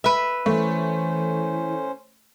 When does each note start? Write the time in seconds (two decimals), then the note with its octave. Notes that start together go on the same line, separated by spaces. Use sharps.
0.04 B4 E5
0.46 E3 A3 C#4 C5